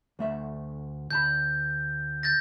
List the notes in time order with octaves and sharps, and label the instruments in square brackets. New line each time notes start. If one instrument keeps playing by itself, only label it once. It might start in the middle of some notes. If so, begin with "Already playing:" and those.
[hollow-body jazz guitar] D2 A3 E5
[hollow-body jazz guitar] D2 A5 B5 [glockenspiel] G6
[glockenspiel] G6 A6 A#6